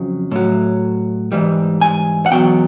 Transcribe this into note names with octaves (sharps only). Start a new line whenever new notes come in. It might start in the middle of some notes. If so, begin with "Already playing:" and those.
Already playing: F2 C#3 F#3
A2 F#3
G#2 E3 G3
G#5
F#5
E2 B2 F#3 G5